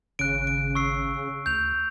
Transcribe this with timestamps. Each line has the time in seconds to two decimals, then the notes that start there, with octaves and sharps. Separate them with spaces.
0.19 G#1 C#3 F#6 D7
0.47 D7
0.75 C#6 E6 C7
1.46 D2 G6 F7